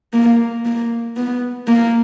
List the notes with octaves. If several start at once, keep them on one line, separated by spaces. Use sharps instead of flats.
A#3
A#3
B3
A#3